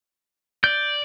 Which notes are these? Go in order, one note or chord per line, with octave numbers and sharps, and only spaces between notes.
D5 G6